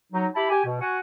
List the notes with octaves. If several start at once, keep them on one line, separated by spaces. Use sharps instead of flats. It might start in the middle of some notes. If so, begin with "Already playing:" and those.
F#3 D#4
E4 G4 A5 B5
G4 G#5
B2
F#4 F#5 G#5